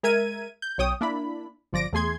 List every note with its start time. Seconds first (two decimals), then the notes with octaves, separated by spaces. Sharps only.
0.03 G#3 A#4 E5 G#6 D#7
0.62 G6
0.78 B1 C#5 G5 D#6
1.01 A#3 D4 E4 B5
1.73 G1 F3 D5 A#6 D7
1.93 E2 A3 G#4 C6 G#6